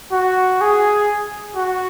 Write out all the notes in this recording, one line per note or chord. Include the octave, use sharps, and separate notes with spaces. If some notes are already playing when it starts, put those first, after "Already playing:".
F#4
G#4
F#4